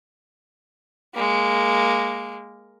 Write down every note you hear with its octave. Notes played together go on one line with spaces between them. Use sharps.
G#3 A#3